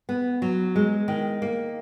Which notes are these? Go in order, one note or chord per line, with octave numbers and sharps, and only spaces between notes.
B3
F#3
G#3
D#3
A#3